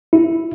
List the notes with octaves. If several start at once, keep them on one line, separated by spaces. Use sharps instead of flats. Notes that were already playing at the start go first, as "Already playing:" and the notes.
E4